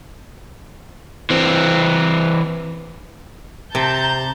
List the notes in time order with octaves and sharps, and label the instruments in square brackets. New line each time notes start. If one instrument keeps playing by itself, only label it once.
[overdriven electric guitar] E3 C4
[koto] C3 [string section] A5 A#5 G6